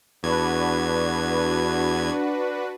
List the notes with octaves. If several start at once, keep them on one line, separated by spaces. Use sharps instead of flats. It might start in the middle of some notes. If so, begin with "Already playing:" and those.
E2 D4 F#4 B4 G#6